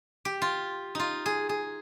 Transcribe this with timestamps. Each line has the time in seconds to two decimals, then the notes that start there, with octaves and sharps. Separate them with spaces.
0.25 G4
0.42 F4
0.95 D#4 F4
1.26 G#4
1.49 G#4